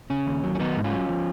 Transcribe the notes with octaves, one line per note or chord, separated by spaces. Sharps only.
C#3 C#4
D#2
F#3
C#4
D#3 B3 D#4
G#2
C#4 F4
F#3
F3